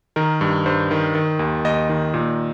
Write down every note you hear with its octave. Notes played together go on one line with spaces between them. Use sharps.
D#3 A#4
G2
G2 C5
D#3
D#3
D#2
D#2 D#5
D#3
A#2